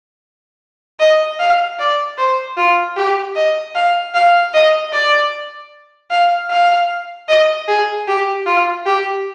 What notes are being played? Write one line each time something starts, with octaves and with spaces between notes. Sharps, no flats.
D#5
F5
D5
C5
F4
G4
D#5
F5
F5
D#5
D5
F5
F5
D#5
G#4
G4
F4
G4